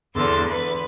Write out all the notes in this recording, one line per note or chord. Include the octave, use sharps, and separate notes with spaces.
E2 D3 C6 A6
B4